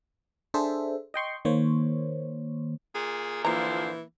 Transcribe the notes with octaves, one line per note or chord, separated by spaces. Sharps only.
D4 G#4 A4 C5 E5
D#5 G5 C6 C#6
D#3 A#3 C5 C#5
A#2 G#4
D3 E3 F3 A#3 C5 A#5